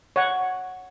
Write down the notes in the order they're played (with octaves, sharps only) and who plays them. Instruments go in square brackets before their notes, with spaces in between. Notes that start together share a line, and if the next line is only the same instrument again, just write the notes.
[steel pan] C#5 F#5